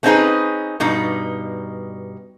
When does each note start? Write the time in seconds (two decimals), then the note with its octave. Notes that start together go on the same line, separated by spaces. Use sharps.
0.03 A3 C4 C#4 D#4 G#4 B4
0.80 G2 B2 D#4